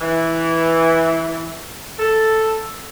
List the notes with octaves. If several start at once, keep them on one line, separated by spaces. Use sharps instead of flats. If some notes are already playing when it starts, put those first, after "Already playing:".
E3
A4